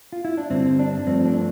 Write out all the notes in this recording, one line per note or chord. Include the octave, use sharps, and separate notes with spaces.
F4
E4
D4
G2 D3 G3 C4
D4
G2 F3 A3 C4
D4